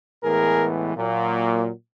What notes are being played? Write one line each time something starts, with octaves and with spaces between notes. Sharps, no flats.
A2 E3 G#3 B3 G#4 A#4
A#2 F#3 A#3